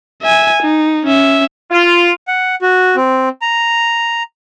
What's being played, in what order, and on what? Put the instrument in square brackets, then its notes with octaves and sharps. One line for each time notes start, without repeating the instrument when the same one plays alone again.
[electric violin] E5 G#5
D#4
C#4 E5
[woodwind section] F4
[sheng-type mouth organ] F#5
F#4
C4
A#5